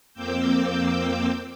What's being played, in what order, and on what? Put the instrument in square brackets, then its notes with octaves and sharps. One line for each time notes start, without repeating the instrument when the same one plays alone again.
[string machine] F2 A#3 C4 D6 E6 G6